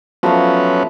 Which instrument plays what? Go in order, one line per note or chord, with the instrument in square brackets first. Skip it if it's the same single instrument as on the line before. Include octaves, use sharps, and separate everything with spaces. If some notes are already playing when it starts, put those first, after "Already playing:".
[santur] F3 A3 F5 [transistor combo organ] F#3 B3 C#4